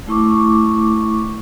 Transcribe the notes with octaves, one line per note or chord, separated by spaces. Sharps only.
A3 E4 C#6 D6